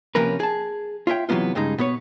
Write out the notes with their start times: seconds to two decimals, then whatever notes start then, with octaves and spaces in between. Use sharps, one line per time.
0.15 C3 F3 A#3 C#4 A#4 B4
0.40 G#4 A5
1.07 F4 C#5 E5 G5
1.29 C3 E3 F#3 A#3 B3 F4
1.55 G2 C#3 G#3 D#4
1.78 B2 B3 B4 C#5